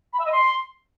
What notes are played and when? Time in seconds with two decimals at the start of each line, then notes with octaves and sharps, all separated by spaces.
0.13 B5
0.19 E5
0.25 D#5
0.32 C6